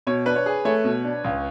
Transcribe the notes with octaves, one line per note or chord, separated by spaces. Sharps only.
B2 C#5
D4 B4
C#5
G#4
A3 C#5
B2
D4
C#2